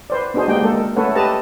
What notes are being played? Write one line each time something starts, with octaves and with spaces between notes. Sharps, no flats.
B4 C5 D5
B3 D4 D#4 F#4 G#4 C5
G#3 A#3 D#4 G4 G#4 G5
G#3 A#3 A4 A#4
A3 C#4 A4 B4 C#5 F#5
G4 A4 B4 D#5 A5 A#5